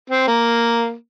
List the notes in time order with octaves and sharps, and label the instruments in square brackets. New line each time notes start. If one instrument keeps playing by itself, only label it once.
[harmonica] C4
A#3